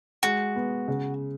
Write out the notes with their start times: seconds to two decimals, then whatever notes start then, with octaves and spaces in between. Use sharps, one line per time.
0.23 G#3 F#4
0.56 B3
0.88 C#3